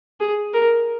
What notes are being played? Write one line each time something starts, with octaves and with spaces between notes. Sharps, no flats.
G#4
A#4